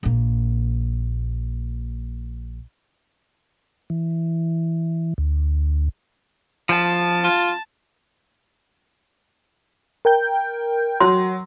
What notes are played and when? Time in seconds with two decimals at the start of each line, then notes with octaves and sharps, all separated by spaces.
0.03 A#1 A#3
3.90 E3
5.18 D2
6.69 F3 A5
7.24 F4
10.05 A#4 G5 G6
11.00 F#3 C6